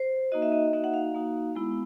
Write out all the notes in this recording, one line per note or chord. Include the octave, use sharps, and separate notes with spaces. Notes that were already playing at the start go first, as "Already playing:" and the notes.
Already playing: C5
A#3 D#4 F#4 D#5
E5
D#5
A#3 D#4 F#4 E5
F#5
F5
A#3 D#4 F#4
G#3 B3 E4